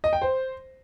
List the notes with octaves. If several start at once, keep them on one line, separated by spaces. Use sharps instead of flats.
D#5
G5
C5